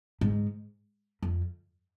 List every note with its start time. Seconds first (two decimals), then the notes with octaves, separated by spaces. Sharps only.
0.21 G#2
1.22 F2